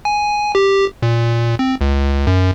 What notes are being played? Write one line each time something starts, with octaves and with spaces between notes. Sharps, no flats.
G#5
G4
A#2
C4
C#2
F#2